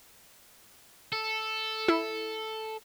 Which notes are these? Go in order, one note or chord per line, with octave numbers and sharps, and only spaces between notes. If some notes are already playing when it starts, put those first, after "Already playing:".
A4
E4